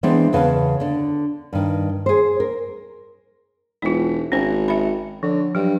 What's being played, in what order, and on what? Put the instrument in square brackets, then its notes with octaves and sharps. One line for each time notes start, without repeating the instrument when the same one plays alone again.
[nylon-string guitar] E3 G#3 B3 C4 D4 C5
E2 C#3 B4 A5
D3 D4
G2 D#3
G#4 C5
A#4
[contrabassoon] E1 [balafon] D#4 F4
[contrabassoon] G#1 [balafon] C#4 C5
[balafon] E5 B5
[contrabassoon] D3 [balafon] F3
[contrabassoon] G2 [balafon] F#3